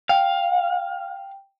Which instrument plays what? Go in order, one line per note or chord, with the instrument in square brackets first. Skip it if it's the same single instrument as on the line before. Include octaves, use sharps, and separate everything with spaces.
[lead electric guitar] F5 [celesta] G5